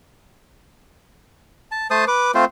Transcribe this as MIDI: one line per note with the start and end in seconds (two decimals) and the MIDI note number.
1.72 1.87 81
1.91 2.05 57
1.91 2.05 72
1.91 2.05 81
1.91 2.05 87
2.07 2.31 71
2.07 2.31 86
2.34 2.45 57
2.34 2.45 60
2.34 2.45 65
2.34 2.45 72